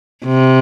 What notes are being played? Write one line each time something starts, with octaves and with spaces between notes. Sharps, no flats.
C3